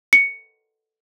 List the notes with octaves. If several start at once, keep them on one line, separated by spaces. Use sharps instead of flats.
C#7